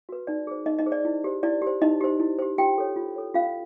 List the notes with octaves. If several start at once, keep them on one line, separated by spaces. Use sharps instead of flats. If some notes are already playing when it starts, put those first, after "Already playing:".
F#4 B4
D#4 D5
G#4 C5
D#4 D#5
D#4 D#5
G#4 C5
D5
E4
G4 C5
E4 D5
G4 C5
D#4 E4 D#5
G4 C5
E4
G4 C5
F4 G4 G5
A4 C#5
F4
A4 C#5
C#4 F4 F5